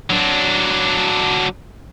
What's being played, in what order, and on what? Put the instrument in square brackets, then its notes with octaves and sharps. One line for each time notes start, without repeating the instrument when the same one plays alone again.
[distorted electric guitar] F#3 D4